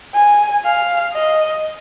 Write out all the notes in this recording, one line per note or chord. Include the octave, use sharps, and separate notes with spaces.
G#5
F5
D#5